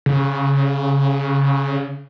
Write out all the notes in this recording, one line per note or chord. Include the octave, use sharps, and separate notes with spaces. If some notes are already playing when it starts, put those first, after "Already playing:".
C#3